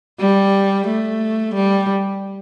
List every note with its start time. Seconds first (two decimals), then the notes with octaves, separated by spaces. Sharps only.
0.20 G3
0.87 A3
1.55 G3